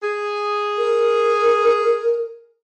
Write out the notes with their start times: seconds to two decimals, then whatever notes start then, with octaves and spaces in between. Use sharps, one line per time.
0.03 G#4
0.77 A#4